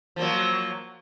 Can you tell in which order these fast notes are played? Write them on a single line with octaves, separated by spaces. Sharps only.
F3 A#3 F#3